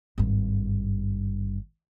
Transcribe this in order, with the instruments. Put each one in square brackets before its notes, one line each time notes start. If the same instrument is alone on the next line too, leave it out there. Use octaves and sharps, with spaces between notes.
[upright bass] G#1 G2